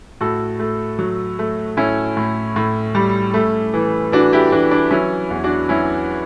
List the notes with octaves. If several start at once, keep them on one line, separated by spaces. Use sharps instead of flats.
A2 F#4 A4
A3
F#3
A3
A2 C#4 E4
A2
A2
G3
A3
E3
E3 D4 F#4
E4 G4
E3 D4 F#4
D4
F#3 C#4 E4
E2
D4 F#4
F#3 C#4 E4